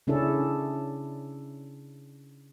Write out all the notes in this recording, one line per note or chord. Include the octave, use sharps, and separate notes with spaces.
C#3 C#4 D4 E4 G#4 A4